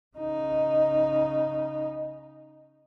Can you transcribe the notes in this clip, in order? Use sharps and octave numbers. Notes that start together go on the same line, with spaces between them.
C#3 D#4